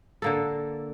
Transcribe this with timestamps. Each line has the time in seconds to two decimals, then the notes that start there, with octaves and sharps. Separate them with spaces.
0.22 D3 A#3 A4